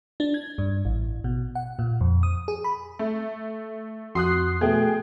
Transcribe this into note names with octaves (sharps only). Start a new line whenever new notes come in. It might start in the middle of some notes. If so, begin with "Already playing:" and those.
D4
G#6
G2
A1
B2
F#5
A#2
F2
D#6
G#4
B5
A3
F2 F#4 C6 D#6 F#6 C7
B2 A3 G#4 G5